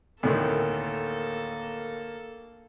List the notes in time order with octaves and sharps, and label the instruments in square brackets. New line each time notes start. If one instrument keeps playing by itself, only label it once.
[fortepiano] D2 A2 D#3 [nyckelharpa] A#3 A4